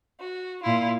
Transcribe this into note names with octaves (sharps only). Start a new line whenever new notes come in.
F#4
A#2 E4 F4